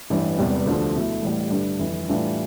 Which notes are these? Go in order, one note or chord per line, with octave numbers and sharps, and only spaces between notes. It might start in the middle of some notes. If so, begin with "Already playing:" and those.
A1 G2 E3
E1 E2 C3 G3 B3
D2 D3 F3
B2 A3 E4
A1 A2 G3
G2 D3 A3
G1 F2 E3
A2 E3 G3 D4 F4